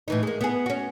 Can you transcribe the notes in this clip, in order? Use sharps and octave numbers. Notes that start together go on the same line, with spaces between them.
A2 E3 D#4
G#3 A#3
B3 E4 G#4
C#4 F#4